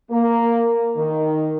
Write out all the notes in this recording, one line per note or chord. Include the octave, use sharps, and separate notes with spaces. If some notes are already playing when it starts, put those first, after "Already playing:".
A#3
D#3